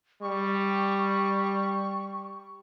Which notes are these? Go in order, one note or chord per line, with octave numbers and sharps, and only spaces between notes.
G3 C#6